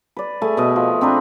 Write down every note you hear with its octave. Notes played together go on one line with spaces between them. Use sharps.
B4 D5
A3 G#4 G#5
B2 D#5
F3
C4 D4 B4 A#5